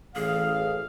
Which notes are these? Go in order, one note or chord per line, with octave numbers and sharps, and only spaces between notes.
A1 G#4 F5